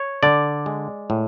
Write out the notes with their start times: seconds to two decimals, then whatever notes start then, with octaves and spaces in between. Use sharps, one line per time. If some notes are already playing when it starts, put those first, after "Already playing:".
Already playing: C#5
0.23 D3 D5
0.66 G#3
1.10 A2